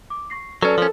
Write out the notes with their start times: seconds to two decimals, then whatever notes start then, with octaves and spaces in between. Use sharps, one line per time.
0.10 D6
0.30 C#6 A#6 C7
0.62 F#3 C#4 A4 B4 D5 A5
0.78 F3 C#4 A#4